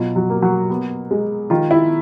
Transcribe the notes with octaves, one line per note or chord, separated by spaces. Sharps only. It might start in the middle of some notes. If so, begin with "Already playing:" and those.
Already playing: B2 F#3 F4
F#3 F#4
A#3
F#3 F#4
B3
G#3
D#3 F4
E4